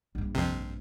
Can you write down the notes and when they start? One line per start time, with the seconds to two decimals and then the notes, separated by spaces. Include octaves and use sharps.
0.15 A#1 G2
0.35 F2 C3